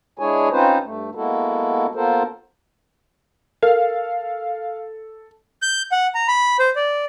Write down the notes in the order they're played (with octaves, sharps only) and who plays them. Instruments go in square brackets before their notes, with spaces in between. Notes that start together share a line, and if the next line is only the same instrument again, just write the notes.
[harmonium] G#3 D4 E4 G#4 C#5 G#5
C4 C#4 D#4 F4 B4 C5
G2 A3
G#3 A#3 B3 E4 F#4 A4
A#3 B3 F4 A4 A#4 C5
[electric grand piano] A4 [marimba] A#4 [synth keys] F5
[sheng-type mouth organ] G6
F#5
A#5
B5
C5
D5